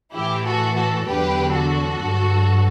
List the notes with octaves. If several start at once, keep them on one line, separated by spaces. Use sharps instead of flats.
A2 E3 E4 G4
F#4 A4
F#4 A4
E2 D3 F#3 G4 B4
F#4 A4
G2 F#3